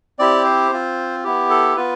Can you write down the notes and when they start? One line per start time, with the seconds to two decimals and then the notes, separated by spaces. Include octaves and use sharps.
0.19 C4 E4 G4 D5
0.45 C5
0.72 C4 F4
1.24 B3 E4 G4
1.50 A4
1.76 B3 F4 B4